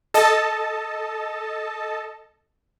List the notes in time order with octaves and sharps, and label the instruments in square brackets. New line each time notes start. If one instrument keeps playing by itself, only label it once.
[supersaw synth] A4 D#5 A5